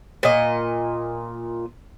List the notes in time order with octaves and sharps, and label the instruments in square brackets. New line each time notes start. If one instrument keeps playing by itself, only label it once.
[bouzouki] A#2 D#5